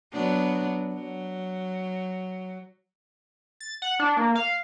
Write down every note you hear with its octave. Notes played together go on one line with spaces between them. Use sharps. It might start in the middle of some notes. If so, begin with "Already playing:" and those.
F#3 B3 D4
F#3
A6
F#5
D4
A#3
F5